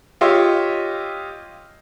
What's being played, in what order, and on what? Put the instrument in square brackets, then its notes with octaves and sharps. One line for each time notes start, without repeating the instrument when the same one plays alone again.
[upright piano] F4 G4 C#5 D#5 C6 E6